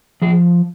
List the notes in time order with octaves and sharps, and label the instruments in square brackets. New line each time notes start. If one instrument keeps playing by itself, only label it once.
[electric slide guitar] F3 G#4